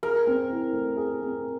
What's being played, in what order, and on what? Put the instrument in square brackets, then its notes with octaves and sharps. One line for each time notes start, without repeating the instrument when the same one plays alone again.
[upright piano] G#4 [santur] A#4
[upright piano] C4
E4
A3
G#4
C4